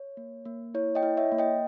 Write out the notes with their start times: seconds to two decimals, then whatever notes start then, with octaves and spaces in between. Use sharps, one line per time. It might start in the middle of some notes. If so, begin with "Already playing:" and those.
Already playing: C#5
0.17 A#3
0.45 A#3
0.74 E4 C#5
0.95 D#5 G5
1.03 E4
1.17 C#5 E5
1.32 A#3
1.38 D#5 G5